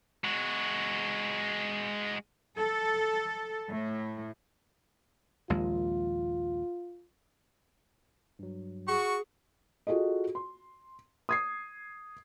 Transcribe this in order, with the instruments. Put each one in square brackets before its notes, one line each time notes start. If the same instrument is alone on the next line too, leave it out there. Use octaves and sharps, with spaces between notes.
[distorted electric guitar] G#3 F#4
[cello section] A4
A2
[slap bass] A#1 D#2 G#3 [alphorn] F4
[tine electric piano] G2 F#3
[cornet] F#4 [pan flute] G#4 [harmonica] C#6
[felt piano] F4 F#4 G#4 A4 D#5
C6
D#6 G#6 C7